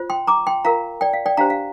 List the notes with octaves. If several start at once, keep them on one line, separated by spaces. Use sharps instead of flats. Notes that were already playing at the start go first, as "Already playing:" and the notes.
Already playing: F4 C5
G5 C6
A#5 D6
G5 C6
F4 A#4 F5 A#5
D5 G5
F5
D5 G5
D4 G4 C5 F5 A#5
F5